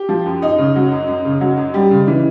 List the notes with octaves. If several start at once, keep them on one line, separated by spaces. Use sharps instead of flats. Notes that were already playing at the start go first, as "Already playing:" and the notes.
Already playing: G4
F3
F#2
F#2 D#4
C#3
F#3
F#2
F#2
C#3
F#3
F#2
G3
C#3
E3